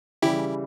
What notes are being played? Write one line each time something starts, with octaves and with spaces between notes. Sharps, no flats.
C#3 E3 G3 E4 G4